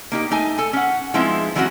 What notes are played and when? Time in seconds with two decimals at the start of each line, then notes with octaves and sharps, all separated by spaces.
0.12 A#3 D#4 G4
0.31 A3 D#4 G#5
0.58 A4 G#5
0.73 C#4 F#5
1.14 F3 G#3 B3 C4 D#4 E4
1.55 E3 F#3 G#3 C4 C#4 F#4